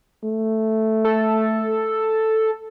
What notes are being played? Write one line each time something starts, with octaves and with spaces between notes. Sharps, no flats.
A3
A4